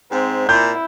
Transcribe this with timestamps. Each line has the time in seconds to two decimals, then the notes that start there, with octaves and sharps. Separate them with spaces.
0.12 G#2 C4
0.49 A#2 E4 G6